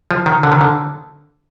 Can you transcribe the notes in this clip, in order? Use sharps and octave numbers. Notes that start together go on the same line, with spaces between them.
F3
D#3
D3
D#3
D3